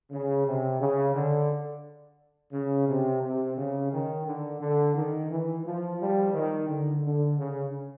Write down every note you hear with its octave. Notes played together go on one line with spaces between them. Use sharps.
C#3
C3
C#3
D3
C#3
C3
C3
C#3
D#3
D3
D3
D#3
E3
F3
F3 G3
D#3
D3
D3
C#3